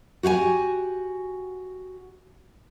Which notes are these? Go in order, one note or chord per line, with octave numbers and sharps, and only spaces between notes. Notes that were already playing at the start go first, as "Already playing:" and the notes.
F#4 G4 F#5 G#5